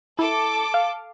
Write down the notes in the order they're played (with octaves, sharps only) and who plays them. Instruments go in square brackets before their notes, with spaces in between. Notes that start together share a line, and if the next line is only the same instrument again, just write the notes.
[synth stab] E4 [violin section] A4 D6
[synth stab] F5